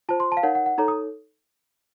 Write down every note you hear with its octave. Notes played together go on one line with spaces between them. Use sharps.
F4 C5 A5
C6
A5
F5
D#4 A#4 C#5 F#5
F#5
F#5
D#4 A4 C#5 A#5
D#6